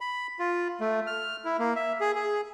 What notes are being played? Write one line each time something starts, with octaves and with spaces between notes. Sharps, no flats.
B5
F4
A3
F6
E4
A#3
E5
G#4
G#4